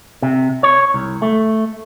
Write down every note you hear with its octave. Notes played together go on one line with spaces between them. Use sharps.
C3
C#5
C2
A3